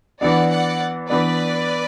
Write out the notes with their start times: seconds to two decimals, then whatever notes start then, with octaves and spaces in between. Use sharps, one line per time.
0.21 E3 B3 D4 D5 F#5
0.50 D5 F#5
1.09 E3 B3 D4 B4 D5